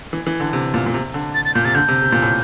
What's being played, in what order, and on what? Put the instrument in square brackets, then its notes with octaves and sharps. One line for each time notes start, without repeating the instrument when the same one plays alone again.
[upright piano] E3
E3
D3
C3
A#2
A#2
C3
D3
[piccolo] A6
A6
[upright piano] A#2 [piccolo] G6
[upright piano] C3 [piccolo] A6
[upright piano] D3 [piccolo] G6
[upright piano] C3
C3
A#2
A2